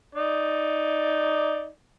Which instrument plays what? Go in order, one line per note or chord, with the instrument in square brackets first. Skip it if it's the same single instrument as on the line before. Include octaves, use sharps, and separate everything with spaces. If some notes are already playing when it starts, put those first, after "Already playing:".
[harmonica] D#4 D5